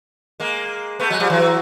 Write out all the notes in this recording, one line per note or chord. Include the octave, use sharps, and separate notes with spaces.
G#3 A#3
A3 B3
F#3 G#3
F3 G3
E3 F#3